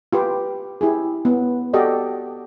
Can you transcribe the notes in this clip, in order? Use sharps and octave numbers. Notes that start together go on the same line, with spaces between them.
F4 G4 B4
E4 G4 G#4
B3
F#4 G4 A4 D5 D#5